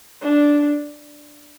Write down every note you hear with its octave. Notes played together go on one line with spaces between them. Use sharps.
D4